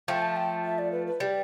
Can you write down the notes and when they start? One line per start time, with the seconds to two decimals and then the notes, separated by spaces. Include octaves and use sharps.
0.08 F3 A3 G5
0.22 A5
0.36 G5
0.64 E5
0.79 D5
0.92 B4
1.07 B4
1.20 G3 D5